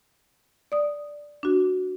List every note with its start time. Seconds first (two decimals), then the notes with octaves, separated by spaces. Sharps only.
0.72 D5 D#6
1.43 D4 F#4